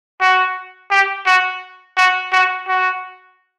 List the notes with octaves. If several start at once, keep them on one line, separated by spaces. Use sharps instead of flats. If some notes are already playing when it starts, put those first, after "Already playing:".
F#4
G4
F#4
F#4
F#4
F#4